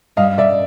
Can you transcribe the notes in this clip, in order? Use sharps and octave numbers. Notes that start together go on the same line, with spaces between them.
G2 G3 D#5 F5
D5 E5